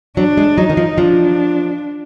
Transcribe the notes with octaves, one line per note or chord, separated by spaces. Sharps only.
F#3 D4
G#3
F#3 D#4
D#3
F3
F3 D4